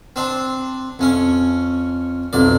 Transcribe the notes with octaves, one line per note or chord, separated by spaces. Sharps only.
C4 D4
F2 C#4 C#6
B1 F2 D5